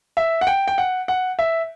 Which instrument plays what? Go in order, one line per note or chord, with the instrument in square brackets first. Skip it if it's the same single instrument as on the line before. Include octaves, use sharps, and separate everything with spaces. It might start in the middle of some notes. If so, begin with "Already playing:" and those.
[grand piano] E5
F#5
G5
G5
F#5
F#5
E5